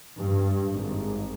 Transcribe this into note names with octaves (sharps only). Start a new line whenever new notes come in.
G2
G#1